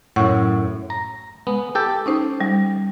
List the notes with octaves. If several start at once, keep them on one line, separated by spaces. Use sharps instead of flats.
F#2 A2 F#5 C#6
A#5
G#3 B3
G4 A4 G5
C#4 D#4 C5
G3